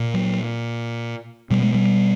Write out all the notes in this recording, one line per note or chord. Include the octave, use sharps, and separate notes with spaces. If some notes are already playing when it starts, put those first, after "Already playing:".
Already playing: A#2
F#3
B2 G3
G#3
G3